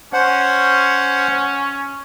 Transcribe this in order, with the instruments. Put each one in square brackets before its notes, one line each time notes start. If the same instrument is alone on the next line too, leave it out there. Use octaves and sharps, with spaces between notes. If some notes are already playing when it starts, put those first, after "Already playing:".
[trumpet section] C#4 [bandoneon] C5 F#5